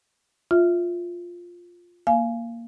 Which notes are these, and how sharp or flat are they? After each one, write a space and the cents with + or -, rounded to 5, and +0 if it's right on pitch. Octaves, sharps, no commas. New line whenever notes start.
F4 +5 E5 +0
A#3 +0 F5 -20 G#5 +15